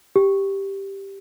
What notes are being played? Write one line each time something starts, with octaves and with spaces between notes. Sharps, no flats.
G4